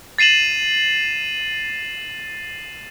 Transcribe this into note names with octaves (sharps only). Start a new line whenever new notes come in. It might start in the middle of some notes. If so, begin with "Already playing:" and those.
A6 C7 D#7 E7 F#7